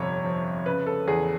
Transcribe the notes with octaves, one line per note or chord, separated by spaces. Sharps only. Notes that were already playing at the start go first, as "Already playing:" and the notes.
Already playing: G1 F2 C3 C#5
F3
C#3 B4
A4
E2 G#4